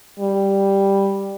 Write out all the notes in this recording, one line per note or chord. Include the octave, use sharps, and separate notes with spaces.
G3